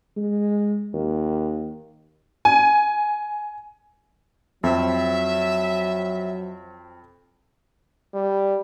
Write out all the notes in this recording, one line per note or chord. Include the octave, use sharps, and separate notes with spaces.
G#3
D#2
G#5
F2 F#3 C4 E5
G3